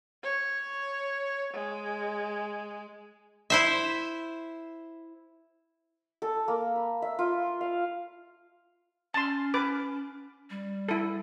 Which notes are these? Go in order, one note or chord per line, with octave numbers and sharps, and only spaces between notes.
C#5
G#3
E4 C5 E5
A4
A#3
B5
E5
F4
F5
C#4 A5 C6
B4 D6
G3
E4 A4